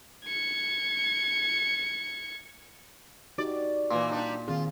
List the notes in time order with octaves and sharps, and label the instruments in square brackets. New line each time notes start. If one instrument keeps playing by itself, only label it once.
[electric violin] G#6 C#7
[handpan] D#4 F#4 G4 [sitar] D5
[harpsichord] A#2 [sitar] E3 A#3
[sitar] G3 D4 D#4
[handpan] D#3 C4 G#4 [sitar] F4